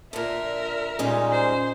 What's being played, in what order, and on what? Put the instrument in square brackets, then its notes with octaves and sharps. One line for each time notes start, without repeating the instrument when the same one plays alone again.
[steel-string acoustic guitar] A#2 D3 [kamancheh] A#4 E5
[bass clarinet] A#2 [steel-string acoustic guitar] G3 G#3 D#4 [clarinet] C#4
[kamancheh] C5